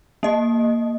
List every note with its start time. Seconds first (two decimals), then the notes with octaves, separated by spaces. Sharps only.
0.23 A#3 D#5